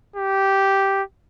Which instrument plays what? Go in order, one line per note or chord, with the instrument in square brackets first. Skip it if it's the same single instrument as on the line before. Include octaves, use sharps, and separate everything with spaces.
[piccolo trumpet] G4